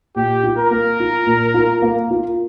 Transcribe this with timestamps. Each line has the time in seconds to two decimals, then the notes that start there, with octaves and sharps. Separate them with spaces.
0.16 A#2 G4
0.44 F4
0.57 A#4
0.71 A#3
1.00 F4
1.27 A#2
1.54 F4
1.82 A#3
2.10 F4